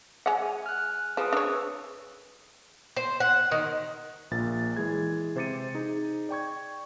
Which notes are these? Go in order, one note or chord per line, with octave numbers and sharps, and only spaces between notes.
G#3 F#5
G#5
F6 F#6
F3 G#4 B4 D#6
D4 C#5 E6
C5
F#5
D#3
A#1 A#2 A6
E3 G#3 G#4 G#6
C3 C5 D6 A6 C#7 D#7
D#4 G#4
D5 G5 C#6 G#6